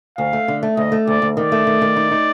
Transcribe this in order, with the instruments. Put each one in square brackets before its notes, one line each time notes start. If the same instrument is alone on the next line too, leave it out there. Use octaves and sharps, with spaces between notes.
[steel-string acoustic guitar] D2 [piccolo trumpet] F5
[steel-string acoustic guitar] A3
D3
A3
[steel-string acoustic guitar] D2 [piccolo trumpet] D#5
[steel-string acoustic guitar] A3
[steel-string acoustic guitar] D2 [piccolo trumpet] D5
[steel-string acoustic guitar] D2
[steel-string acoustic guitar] D#3 [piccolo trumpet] D5
[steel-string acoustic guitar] A3
D#3
D#3
D#4
D#4